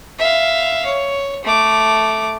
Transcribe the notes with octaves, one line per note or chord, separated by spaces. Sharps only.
E5 F5
C#5
A3 D6